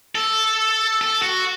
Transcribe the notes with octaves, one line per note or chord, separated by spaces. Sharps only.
A4
A4
F#4